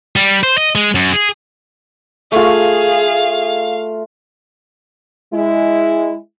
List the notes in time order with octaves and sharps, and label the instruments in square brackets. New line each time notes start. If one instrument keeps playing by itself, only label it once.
[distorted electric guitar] G3
C5
D#5
G#3
F#2
G#4
[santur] A3 F4 [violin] G#4 [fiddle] F5
[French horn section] G#3 E4